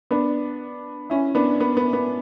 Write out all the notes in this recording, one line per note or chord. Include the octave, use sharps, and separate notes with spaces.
B3 D4
C#4 E4
B3 D4
B3
B3
B3